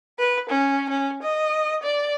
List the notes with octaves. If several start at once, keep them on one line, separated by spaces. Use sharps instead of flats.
B4
C#4
C#4
D#5
D5